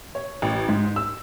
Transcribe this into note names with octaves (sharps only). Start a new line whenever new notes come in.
C#5
A1
G#2
E6